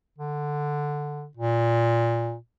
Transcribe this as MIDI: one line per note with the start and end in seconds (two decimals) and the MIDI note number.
0.18 1.26 50
1.37 2.36 46